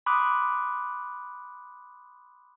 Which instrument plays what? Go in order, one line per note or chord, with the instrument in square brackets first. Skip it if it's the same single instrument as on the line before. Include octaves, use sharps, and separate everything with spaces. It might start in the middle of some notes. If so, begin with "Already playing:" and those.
[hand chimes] B5 C6 D6 D#6 F#6